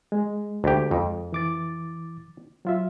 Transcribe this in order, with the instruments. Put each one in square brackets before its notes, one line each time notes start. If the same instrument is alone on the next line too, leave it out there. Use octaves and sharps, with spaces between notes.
[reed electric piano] G#3
[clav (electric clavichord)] D2 G4
F2
[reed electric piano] E3 D6 A6
F#3 F4 E5